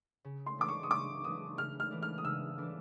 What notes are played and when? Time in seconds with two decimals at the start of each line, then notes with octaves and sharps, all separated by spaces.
0.24 C#3
0.46 C6
0.58 E3 A3 D4 D6
0.69 C#6
0.83 D#6
0.91 C#3 D6
1.24 E3 A3 D4 D#6
1.57 C#3 F6
1.80 F6
1.91 E3 A3 D4
2.03 F6
2.18 D#6
2.24 C#3 E6
2.58 E3 A3 D4